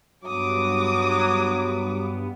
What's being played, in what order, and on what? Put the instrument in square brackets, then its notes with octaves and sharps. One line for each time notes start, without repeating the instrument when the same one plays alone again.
[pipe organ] G2 B3 [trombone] F#3 [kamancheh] D6 D#6